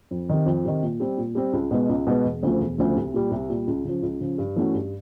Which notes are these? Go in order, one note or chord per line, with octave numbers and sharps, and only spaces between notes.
F2
C3 D#3
F2
C3 D#3
A#2
G3 C4
A#2
G3 C4
C#2
B2 G#3 B3
C#2
B2 G#3 B3
E1
D2 C#3 F3 A3
E1
D2 C#3 F3 A3
C2
A#2 G3
C2
A#2 G3
C#2
C#3 F3
C#2
C#3 F3
G2
E3 A3 C#4 F#4
G2